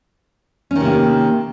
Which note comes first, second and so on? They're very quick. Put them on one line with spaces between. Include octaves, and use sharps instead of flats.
C#4 D#3 C3 A#3